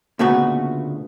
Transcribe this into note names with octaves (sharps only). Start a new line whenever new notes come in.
D2 A#2 C#3 A3 B3 F#4